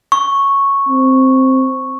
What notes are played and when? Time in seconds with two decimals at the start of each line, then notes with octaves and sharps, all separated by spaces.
0.12 C#6
0.89 C4